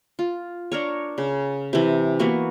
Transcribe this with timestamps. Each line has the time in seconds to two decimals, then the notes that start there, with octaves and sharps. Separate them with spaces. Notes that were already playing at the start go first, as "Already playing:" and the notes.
0.19 F4
0.72 D4 A#4 C#5
1.18 C#3
1.73 C3 E3
2.19 E3 A#3 B3 F#4